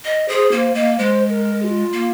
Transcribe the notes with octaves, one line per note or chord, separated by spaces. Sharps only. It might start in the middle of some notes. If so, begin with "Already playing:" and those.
D#5
G#4 C5
A#3 C5
A#3 D#5
G#3 C5
A#4
G#4
F4
A#3